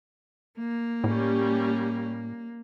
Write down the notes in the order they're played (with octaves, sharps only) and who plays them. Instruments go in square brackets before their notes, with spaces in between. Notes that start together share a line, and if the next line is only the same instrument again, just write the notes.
[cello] A#3
[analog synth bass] A2 [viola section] G3 C#4 G4